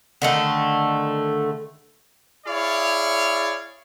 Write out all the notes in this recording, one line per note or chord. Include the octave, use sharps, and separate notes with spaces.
D3 D#3 A3
E4 G#4 C#5 D5 F5